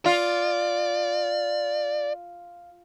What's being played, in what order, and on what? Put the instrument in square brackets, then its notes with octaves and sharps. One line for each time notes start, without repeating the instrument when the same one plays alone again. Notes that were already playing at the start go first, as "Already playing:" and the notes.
[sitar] F4 [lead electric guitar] D5